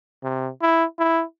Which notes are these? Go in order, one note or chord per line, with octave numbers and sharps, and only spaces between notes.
C3
E4
E4